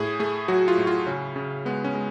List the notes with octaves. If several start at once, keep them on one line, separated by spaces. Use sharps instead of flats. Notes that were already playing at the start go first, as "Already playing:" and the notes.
Already playing: A2 G#4
A3 G#4
F#3 F#4
F4
A2
F4
C#3 C#4
C#3
G#3 B3
C#4
G#3